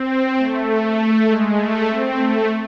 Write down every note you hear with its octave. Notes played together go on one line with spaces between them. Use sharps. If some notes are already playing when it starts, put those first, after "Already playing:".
Already playing: C4
A3
G#3
A3
C4
A3